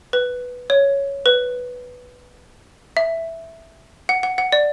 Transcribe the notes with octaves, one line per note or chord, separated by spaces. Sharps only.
B4
C#5
B4
E5
F#5
F#5
F#5
D5